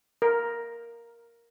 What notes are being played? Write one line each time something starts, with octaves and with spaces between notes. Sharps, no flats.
A#4